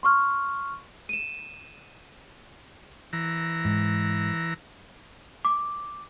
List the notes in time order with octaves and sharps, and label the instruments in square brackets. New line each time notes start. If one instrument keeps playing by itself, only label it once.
[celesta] C6 C#6 F6
D#7 E7
[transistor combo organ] E3 A#5
[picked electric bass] G#2
[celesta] D6